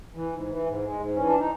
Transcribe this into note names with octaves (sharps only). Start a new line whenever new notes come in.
E3
G#2
E3
G#2
G#3
G#2
E3 C#4
D4
D#4